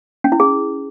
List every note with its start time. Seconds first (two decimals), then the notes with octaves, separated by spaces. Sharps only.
0.24 C#4
0.32 E4
0.40 G#4